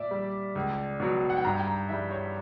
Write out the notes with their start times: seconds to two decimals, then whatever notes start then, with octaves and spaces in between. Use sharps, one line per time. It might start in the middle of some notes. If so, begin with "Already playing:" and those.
Already playing: A#2 D5 E5
0.11 G3
0.55 C#2
1.00 B2 F#3
1.30 F#5
1.37 G5
1.45 G2 A#5
1.59 G5
1.67 A#5
1.89 E3 G3 E5
2.11 C#5